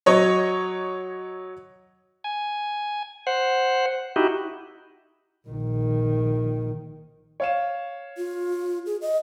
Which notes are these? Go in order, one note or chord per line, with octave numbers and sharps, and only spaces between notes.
F#3 C#5 D#5
G#5
C5 F#5
D#4 E4 F#4 G4
A#1 D#3
C#5 F5 E7
F4
G#4
D#5